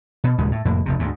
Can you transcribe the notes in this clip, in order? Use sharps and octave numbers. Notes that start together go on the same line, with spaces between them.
B2
D#1 D#2 C#3 G#3
A2
F1 F2 A2 A#3
F1 D2 C3
D2 G#2